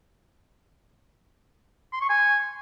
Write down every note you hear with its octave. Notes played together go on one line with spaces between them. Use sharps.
C6
C#6
G#5